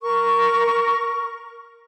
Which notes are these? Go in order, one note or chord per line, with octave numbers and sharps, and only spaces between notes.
A#4 C#6